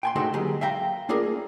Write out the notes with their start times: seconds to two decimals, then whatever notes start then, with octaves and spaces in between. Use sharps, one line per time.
0.03 G5 G#5 C6
0.15 D3 G#3 A3 D#4 F#4 C5
0.33 F#3 G#3 A#3 G4 G#4
0.61 E5 F5 G5 A#5
1.09 A3 A#3 D4 F4 G#4 A#4